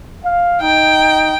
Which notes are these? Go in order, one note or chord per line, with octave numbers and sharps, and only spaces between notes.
F5
D#4 G5